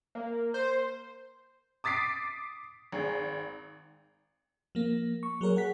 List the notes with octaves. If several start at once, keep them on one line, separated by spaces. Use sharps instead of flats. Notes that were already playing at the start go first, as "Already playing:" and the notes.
A#3
C5
D6 D#6 A6 B6 C7 D7
G#1 G#4
F3 A#3
C#6
F#3 G#4 A#4 C#5
G#4 F#5 B6